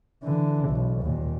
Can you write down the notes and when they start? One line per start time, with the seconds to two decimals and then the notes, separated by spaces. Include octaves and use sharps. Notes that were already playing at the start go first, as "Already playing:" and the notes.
0.23 D3 E3
0.69 B1
1.02 D#2 A#2